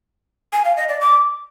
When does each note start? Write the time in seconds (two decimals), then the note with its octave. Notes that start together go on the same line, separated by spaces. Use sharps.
0.53 G#5
0.65 F5
0.77 D#5
0.89 D5
1.01 D6